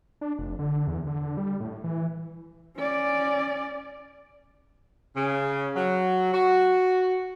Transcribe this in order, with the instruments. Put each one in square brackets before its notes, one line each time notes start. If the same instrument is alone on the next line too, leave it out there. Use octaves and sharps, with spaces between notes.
[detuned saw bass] D4
F1
D3
E2
D3
G3
A2
E3
[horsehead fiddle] C#4 D5
[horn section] C#3
F#3
F#4